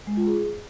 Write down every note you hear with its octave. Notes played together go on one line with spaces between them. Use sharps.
G#3
F4
G#4